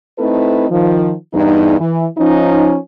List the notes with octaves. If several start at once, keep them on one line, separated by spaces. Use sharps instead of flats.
A3 C4 D#4 E4 A4 B4
D#3 F3
E2 G2 D#4
E3
F3 C#4 D#4